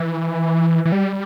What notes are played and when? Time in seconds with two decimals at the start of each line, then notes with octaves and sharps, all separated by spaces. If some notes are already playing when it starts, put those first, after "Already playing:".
Already playing: E3
0.85 E3
0.92 G3